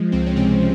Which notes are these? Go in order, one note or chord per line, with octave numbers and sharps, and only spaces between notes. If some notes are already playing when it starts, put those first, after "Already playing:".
Already playing: F3 G#3
C#2 C4
C#4
C3 C4
F3